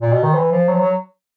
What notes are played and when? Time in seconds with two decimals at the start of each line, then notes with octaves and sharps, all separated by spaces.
0.02 A#2
0.12 B2
0.23 D#3
0.35 E3
0.52 F3
0.69 F#3
0.75 F3
0.79 F#3